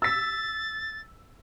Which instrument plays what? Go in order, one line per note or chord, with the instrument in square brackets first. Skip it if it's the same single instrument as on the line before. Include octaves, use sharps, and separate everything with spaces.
[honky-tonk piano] E6 B6 [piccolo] A6